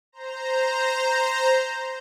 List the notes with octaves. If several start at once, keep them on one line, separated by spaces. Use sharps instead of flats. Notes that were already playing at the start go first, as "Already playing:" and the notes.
C5 A#5